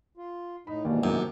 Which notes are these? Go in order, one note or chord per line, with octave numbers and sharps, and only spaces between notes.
F4
A2 D#4 D#5 B5
D#2 G#2 B2 E3 D5
F#2 C3 F#3